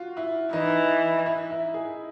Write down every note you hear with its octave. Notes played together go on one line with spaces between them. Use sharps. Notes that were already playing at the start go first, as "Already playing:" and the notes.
Already playing: F4 F#4
E4
E3 D#4
E4
E4
G#4